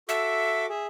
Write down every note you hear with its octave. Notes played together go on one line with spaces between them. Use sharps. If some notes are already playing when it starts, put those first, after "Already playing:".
F#4 A4 E5 D6
G#4 E5